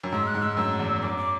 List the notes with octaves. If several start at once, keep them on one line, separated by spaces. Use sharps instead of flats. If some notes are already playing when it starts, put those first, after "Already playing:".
F#2
G#2 E6
F#6
G#2
E6
F#2 E6
E2
F#2 D6
D6